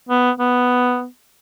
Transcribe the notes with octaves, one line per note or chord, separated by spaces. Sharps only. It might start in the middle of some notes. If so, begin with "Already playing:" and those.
B3
B3